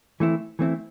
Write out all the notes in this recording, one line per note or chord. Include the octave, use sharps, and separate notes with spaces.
E3 A3 C4 E4
E3 A3 C4 E4